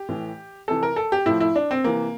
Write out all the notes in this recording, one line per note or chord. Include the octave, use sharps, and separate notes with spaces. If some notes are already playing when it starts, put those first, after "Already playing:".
Already playing: G4
A2 E3
C3 E3 A4
A#4
A4
G4
A2 F3 E4
E4
D4
C4
C3 E3 A#3